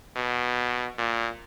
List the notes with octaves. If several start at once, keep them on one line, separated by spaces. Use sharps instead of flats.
B2
A#2